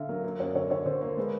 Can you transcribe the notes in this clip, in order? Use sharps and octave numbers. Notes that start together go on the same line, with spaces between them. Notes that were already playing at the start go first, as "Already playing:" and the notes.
Already playing: D3 E5 F5
F#3 A#4
A#3 A#4
F#2 C#5
D3 C#5
D3 C#5
D3 C5
A#3 C5
G#3 B4